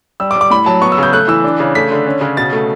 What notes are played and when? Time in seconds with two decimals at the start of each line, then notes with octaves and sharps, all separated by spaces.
0.20 G3 E6
0.31 D6
0.36 G3
0.41 D6
0.51 A2 B5
0.66 F#3 A5
0.81 B3 C#6
0.92 E6
0.98 C#3 G6
1.12 A3 F#6
1.28 E3 E6
1.44 D4
1.60 C#3
1.75 A3 B6
1.91 D3
2.06 C#4
2.21 C#3
2.37 B2 A6
2.53 A3